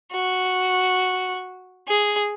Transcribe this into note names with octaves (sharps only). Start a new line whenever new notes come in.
F#4
G#4